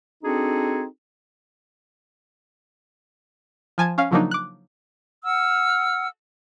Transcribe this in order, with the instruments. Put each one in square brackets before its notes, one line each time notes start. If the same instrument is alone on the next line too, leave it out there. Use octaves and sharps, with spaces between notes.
[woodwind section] C4 D4 D#4 F#4 G#4 A4
[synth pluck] F3 G#5 A5 G#6
C#4 F5
C#3 F3 F#3 A#3 D4 D#4
D6 F#6
[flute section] F#5 E6 F6